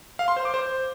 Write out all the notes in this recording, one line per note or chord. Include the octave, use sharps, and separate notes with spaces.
F5
C6
C5
D6
C5